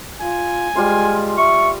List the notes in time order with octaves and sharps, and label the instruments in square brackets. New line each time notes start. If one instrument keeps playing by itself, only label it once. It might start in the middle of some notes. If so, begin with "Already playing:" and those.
[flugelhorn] F4 [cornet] G#5
[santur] G3 F4 C5 [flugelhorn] G#3
[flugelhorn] E5 [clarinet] C#6